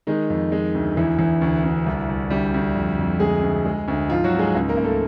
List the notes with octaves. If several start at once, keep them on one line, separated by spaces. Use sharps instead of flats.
D#3 G#3 D#4
F2
G#3
D2
E2 E3 E4
E2
D2
D2
C2
C2
D2 G3 G4
D2
F2
F2
D2 G#3 G#4
D2
G#3
D2
G#2 F3 F4
F#3 F#4
G#2
G#3 G#4
C#2
A#3 A#4
C#2
A3 A4